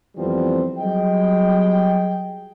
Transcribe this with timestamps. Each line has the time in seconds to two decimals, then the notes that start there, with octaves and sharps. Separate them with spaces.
0.18 F2 E3 F3 G3 B3 C4
0.78 F#3 G3 G#4 D#5 G5